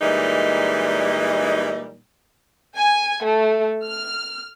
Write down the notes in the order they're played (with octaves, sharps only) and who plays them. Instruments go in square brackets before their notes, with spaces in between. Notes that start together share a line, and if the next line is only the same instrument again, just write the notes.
[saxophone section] A#2 E3 G3 G#3 D#4
[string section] G#5
A3
F6